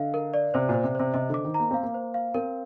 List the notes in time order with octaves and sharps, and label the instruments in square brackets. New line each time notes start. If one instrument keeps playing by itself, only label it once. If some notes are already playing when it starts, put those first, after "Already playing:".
Already playing: [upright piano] D3 [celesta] D#5 F5
[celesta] A#4
D5
[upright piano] C3 [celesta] C5
[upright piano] A#2
[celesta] C5
[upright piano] C3
[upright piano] C3 [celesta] C5
[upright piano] C3 [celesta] D#5
[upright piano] D3 [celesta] D6
[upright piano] D#3
[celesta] A#5
[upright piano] A#3
[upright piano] C4 [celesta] F5
[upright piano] A#3
[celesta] C5
F5
[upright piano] C4 [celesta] A#4